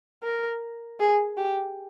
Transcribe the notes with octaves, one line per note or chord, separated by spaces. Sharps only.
A#4
G#4
G4